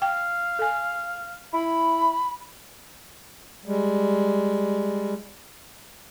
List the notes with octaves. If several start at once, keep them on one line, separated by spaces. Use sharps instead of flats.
F5 G5
A4 G#5
E4 B5
G3 G#3